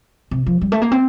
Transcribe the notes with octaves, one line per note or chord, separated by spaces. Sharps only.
C3
F3
G3
A3
A#3
C4